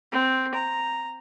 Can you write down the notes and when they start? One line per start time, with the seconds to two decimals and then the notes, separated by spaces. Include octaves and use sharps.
0.11 C4
0.54 A#5